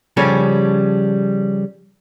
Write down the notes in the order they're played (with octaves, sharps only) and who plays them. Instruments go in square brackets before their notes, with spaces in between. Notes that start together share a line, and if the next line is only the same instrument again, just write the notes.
[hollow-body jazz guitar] C#3 F3 G3 C#4 A4